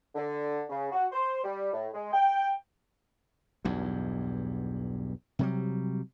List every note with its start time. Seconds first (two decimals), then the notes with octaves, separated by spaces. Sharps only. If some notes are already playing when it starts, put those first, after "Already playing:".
0.15 D3
0.70 C#3
0.92 F#4
1.12 C5
1.44 G3
1.73 A2
1.94 G#3
2.13 G5
3.65 B1 E2 G2
5.39 C3 F#3 G3